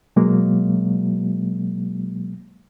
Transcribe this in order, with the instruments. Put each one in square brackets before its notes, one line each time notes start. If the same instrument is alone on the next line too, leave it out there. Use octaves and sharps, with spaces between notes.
[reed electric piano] B2 F#3 G#3 A#3